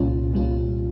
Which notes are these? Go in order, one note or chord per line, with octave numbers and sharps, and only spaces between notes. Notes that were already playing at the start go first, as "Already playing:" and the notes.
Already playing: C2 A#2 G3 C#4 F4
C2 A#2 G3 C#4 F4